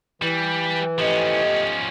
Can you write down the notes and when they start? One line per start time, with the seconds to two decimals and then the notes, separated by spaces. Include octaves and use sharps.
0.22 E3 G3
0.99 F3 A3 C#4 G4 D#5